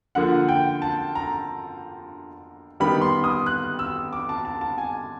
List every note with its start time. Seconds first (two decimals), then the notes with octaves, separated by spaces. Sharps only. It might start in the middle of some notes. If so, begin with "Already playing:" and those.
0.15 D3 F3 A#3 F#5
0.49 G5
0.82 A5
1.15 A#5
2.80 D#3 G3 B3 B5
3.02 C6
3.24 D#6
3.46 F#6
3.79 E6
4.13 D6
4.29 A5
4.45 A5
4.61 A5
4.78 G#5